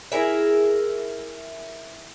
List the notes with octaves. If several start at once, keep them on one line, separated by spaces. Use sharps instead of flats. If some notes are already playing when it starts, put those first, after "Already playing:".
E4 G#4 A#4 E5